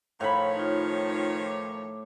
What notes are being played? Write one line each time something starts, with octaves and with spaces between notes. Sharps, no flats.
A2 D#3 F3 C#5 F5 B5
D#4 F4
D6